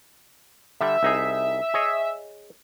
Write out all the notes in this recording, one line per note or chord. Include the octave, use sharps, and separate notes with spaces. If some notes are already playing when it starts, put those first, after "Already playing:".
D3 G3 E5
C2 D#4 G#4
G#4 C#5 D#5